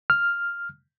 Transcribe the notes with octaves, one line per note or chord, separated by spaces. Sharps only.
F6